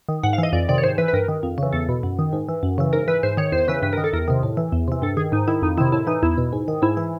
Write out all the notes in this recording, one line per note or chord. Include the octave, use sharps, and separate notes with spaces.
D#3
G#2 F#5
F5
E3 D#5
F2 D5
C3 D#3 D5
C#5
G#2 C5
E3 B4
B4
G2 A#4
D#3
F2
C#3 E3
E2 A4
B2
F#2
D#3
G#2
E3
F#2
C#3 E3
G#2 A#4
E3 B4
G#2 C5
D#3 C#5
E2 C5
C#3 E3 B4
G2 B4
D#3 A#4
A4
E2 A#4
C3 D#3
A2
E3
E2
C3 E3
G2 A4
D#3 G#4
G#2 D#4
D#3 E4
F2 D#4
C3 D#3 E4
A2 E4
E3 D#4
E2 E4
B2
G#2
D#3
G#2 E4
E3